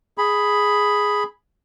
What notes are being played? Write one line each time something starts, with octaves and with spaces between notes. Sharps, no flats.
G#4 B5